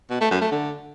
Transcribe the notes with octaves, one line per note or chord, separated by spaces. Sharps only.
B2
A3
F#2
A3
D3